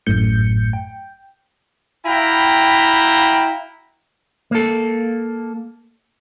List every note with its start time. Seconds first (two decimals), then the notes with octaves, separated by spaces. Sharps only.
0.06 G#1 F#2 A2 G6 C#7
0.73 G5
2.06 E4 F#4 F5 G5 A#5 B5
4.51 A#3 A4